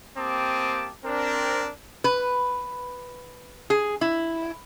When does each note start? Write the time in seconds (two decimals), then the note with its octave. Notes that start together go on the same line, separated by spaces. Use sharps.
0.18 A#3 C4 G4 A5 D6 D#6
1.05 C4 D4 A#4
2.04 B4
3.70 G#4
4.01 E4